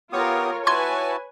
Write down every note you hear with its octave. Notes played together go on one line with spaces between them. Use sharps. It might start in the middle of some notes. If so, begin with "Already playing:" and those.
B3 F4 G4 A#4 C#5 D#6
E4 F#4 B4 G#5 A5 C6 C#6 G#6